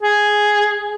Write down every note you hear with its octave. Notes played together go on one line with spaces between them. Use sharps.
G#4